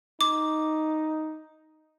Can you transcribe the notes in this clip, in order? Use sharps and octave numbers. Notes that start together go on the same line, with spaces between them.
D#4 D6